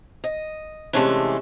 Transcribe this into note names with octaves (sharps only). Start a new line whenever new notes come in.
D#5
C3 E3 G#3 A3 C#4 D4